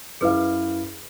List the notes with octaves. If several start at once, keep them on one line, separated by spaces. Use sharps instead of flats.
F#2 E4 G#4 B4 F5